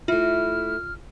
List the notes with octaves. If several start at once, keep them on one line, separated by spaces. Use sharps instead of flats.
A3 E4 F4 F6